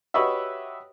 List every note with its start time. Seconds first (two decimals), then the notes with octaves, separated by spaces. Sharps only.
0.14 F#4 G4 B4 C#5 D#5 E5